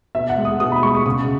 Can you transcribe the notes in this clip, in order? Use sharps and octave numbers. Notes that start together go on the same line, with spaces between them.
B2 E5
F#5
G#3
D#6
B2 D#6
B5
G#3 C#6
D#6
C#3 D#6